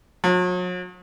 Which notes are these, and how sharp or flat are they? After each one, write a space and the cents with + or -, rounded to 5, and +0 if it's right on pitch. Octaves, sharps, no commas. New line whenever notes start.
F#3 -40